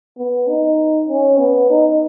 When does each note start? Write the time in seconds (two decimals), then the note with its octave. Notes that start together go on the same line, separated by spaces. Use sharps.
0.17 B3
0.47 D#4
1.09 C#4
1.39 B3
1.70 D#4